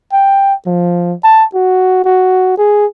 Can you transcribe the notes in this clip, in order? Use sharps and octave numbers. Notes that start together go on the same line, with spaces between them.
G5
F3
A5
F#4
F#4
G#4